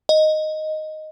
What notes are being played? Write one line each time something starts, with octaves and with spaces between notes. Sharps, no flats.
D#5